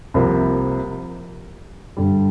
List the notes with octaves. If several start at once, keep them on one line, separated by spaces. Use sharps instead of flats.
C2 C3 F3 A#3
G2 D3 G3